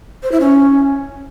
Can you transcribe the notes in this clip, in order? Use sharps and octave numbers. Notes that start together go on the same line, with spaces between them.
C5
E4
C#4